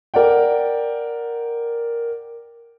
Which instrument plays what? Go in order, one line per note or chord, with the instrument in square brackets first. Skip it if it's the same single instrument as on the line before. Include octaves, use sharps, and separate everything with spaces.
[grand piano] A#4 D5 F#5 G5